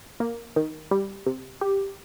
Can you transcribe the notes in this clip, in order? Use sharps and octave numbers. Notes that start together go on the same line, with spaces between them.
A#3
D#3
G3
C3
G4